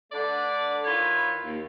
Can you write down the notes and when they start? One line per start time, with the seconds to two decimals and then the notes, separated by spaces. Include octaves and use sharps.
0.11 D3 A3 D4 B4 D5
0.85 D#3 E4 F4 B4 C#5
1.43 D#2